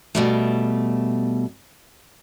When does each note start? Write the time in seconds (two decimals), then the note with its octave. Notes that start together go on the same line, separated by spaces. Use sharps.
0.15 B2 G3 A3